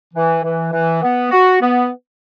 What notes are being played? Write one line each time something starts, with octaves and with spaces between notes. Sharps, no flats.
E3
E3
E3
B3
F#4
B3